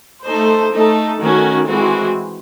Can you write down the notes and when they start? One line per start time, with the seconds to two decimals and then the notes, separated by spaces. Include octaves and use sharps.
0.24 A3 D#4 A4 C5
0.72 A3 D#4 A4
1.19 D#3 A3 C#4 F#4
1.67 E3 G#3 C4 F#4